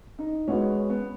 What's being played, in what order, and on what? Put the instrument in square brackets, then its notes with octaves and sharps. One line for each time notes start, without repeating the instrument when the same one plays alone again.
[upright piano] D#4
[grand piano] G#3 B3 F#4 [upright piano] C#4
[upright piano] C#4
B3